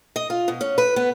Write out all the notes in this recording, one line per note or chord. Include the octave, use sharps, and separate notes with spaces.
D#5
F4
B2
C#4
B4
B3